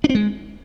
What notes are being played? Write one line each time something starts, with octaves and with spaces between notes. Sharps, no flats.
D4
C4
G#3